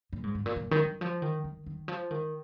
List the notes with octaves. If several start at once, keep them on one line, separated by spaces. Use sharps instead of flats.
A#2
G#2
G#2
A#2
A#2
D#3
D#3
F3
D#3
D#3
D#3
F3
D#3